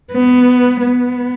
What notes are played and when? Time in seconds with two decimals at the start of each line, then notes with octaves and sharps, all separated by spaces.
0.12 B3
0.81 B3